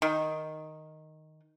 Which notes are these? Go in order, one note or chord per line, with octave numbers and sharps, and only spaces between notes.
D#3